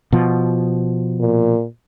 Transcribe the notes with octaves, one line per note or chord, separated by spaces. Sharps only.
B2 F3
A#2